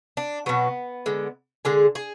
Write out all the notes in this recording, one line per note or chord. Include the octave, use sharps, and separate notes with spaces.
D4
B2 F#3 B3
D3 G#3
D3 G#3 G#4
G#4